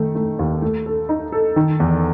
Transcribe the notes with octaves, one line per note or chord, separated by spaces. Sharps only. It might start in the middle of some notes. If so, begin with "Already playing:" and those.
Already playing: D#3 A3
A3
D#2
A3
A4
D#4
A4
D#3
E2